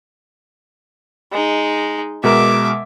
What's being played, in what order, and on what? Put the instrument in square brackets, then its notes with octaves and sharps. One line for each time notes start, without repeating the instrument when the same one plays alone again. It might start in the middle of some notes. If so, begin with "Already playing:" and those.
[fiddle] G#3 D#4
[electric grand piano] B2 G#3 A#4 [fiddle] E5 D6